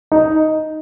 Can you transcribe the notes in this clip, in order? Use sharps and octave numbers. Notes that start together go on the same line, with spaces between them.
D#4